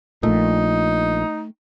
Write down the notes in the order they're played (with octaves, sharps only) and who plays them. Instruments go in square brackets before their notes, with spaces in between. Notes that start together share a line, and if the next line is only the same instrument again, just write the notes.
[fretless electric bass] A#1 A#2 [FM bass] A3 [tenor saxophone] D#4